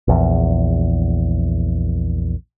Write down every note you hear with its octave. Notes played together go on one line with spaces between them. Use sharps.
A#1 E2